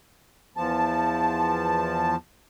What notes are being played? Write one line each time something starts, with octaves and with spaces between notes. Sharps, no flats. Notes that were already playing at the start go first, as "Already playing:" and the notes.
E2 F3 A5